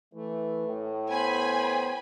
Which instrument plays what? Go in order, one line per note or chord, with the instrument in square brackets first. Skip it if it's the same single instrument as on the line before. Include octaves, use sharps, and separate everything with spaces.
[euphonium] E3 [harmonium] A3
[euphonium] A2
[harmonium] B3 C5 [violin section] G#5 B5